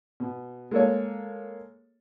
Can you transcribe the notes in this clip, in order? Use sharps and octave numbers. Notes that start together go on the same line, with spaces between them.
B2
G#3 A#3 A4 C#5